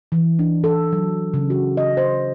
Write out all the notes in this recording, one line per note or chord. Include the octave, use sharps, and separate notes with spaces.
E3
D4
A4
F#3
C#3
F#4
D#5
C5